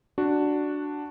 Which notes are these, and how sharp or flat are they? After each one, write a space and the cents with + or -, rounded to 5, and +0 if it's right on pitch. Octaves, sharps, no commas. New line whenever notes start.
D4 +0 F#4 +0